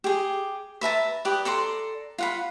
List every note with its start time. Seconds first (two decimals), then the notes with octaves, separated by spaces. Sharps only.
0.04 G4 G#4
0.81 B4 E5 A5 A#5
1.25 G4 B4 D5 D#6
1.45 A4 D5 A#5 C6
2.18 F4 F#5 B5